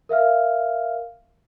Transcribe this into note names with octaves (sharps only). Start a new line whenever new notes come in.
A#4 E5 F5 F6